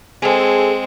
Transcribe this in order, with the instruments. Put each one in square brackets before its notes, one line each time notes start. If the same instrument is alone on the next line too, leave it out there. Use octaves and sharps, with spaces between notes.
[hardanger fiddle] G#3 C4 [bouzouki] G#4 A4